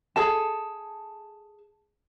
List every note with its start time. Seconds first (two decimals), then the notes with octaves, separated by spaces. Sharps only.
0.16 G#4 A4 A5